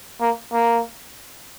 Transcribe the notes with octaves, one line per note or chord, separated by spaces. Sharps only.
A#3
A#3